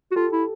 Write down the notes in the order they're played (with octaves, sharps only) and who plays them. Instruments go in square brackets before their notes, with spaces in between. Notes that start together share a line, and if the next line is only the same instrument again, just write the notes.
[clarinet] F#4
[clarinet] F4 [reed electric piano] G4 A4
[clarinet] E4